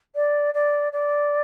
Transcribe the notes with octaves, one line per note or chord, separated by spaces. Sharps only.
D5
D5
D5